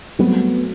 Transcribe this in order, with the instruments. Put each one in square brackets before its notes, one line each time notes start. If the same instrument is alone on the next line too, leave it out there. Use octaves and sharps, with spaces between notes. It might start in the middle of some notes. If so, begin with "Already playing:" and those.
[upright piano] F#3 A3 C4 F#4 [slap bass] G3 B3